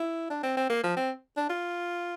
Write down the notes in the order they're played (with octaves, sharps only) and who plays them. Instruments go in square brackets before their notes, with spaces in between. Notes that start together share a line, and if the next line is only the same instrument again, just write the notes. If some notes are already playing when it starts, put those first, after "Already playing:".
Already playing: [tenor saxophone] E4
D4
C4
C4
A#3
F3
C4
D4
F4